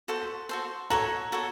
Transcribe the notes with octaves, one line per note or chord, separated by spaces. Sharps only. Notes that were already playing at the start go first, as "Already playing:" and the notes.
F#4 A4 C5
F#4 A4 C5
F#4 A4 C#5 A#5
F#4 A4 C#5